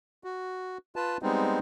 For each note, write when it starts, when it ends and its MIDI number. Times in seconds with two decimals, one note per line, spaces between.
0.24 0.78 66
0.96 1.17 65
0.96 1.17 71
0.96 1.17 81
1.23 1.59 55
1.23 1.59 56
1.23 1.59 59
1.23 1.59 60
1.23 1.59 63